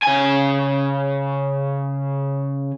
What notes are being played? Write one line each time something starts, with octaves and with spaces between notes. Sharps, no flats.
C#3 G#5